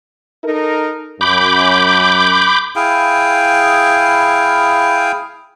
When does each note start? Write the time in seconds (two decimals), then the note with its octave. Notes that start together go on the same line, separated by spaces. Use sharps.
0.44 D#4 A4 A#4
1.21 F#2 B5 D6 G6
2.76 E4 G#4 F5 G5